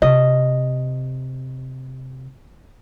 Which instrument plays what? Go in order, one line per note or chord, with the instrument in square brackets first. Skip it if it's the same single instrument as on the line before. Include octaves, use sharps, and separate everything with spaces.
[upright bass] C3 [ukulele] D#5